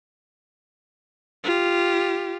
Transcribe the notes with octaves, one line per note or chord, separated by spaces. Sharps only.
F4 G4